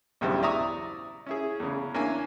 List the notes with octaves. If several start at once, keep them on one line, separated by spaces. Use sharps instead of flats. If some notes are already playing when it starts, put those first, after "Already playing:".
B1 E2 G2 C#3 E4 C5
E4 D5 E5 A#5 C#6 D#6
C#4 E4 G#4
E2 C#3
A#3 C#4 D4 E4 G#5